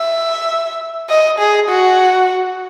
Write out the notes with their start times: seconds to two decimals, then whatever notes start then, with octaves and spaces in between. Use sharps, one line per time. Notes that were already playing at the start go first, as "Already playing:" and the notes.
Already playing: E5
1.10 D#5
1.39 G#4
1.69 F#4